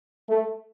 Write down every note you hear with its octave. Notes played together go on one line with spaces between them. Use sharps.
A3